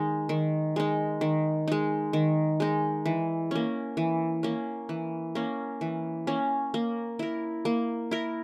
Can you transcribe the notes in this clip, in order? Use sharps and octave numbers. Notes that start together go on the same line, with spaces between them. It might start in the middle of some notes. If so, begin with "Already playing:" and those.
Already playing: D#3 G#3 D#4
D#3
G#3 D#4
D#3
G#3 D#4
D#3
G#3 D#4
E3
A#3 C#4
E3
A#3 C#4
E3
A#3 C#4
E3
A#3 C#4
A#3
E4 A#4
A#3
E4 A#4